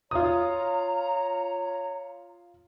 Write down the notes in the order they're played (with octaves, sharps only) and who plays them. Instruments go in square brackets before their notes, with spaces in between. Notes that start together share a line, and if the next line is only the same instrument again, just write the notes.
[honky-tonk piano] F4 D#6 [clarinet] C#5 [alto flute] A#5